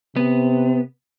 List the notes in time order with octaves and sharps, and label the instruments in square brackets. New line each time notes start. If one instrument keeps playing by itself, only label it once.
[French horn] C3 [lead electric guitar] B3